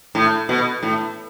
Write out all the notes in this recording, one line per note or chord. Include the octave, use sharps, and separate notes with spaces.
A2
B2
A2